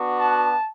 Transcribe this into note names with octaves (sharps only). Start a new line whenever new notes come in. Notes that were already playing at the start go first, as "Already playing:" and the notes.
Already playing: B3 D4 F#4
A5